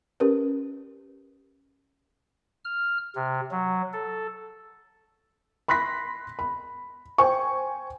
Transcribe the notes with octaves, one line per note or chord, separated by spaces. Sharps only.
C#4 G4 A#4 B4
F6
C3
F#3
A4
B5 C6 F#6 A#6 B6
B5
C5 G5 G#5 C#6